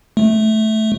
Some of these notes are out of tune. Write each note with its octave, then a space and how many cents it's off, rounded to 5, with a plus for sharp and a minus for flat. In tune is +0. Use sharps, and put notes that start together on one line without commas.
A3 -10